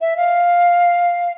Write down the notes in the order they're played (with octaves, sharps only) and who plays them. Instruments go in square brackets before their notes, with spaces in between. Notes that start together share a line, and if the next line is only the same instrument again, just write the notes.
[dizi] E5
F5